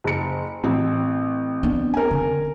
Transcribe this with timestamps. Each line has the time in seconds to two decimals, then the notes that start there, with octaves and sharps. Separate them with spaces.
0.04 F#1 C#7
0.64 A1 C4
1.63 B3 D4
1.94 A#4 G#5
2.11 D3 C#4